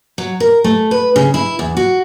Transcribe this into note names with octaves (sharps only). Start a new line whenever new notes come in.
F#3
A#4
A3
B4
C#3
E4
E2
F#4